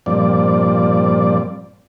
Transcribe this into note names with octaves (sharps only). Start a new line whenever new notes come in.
G2 A#2 F3 C4 D5